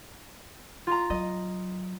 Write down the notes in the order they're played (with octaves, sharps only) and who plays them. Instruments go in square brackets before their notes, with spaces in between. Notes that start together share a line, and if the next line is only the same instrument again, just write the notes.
[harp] F4 A#5
[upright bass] F#3 [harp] D#5